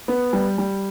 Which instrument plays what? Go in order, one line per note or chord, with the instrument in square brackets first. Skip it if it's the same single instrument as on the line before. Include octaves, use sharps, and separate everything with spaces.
[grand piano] B3
G3
G3